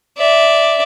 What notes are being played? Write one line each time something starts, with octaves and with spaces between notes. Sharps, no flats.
D5 E5